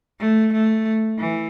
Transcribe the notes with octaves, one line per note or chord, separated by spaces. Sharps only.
A3
A3
E3